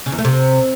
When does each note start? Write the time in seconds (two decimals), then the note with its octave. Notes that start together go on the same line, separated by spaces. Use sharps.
0.06 C#3
0.12 E2
0.18 A3
0.25 C3